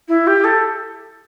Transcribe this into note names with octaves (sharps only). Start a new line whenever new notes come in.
E4
G4
A4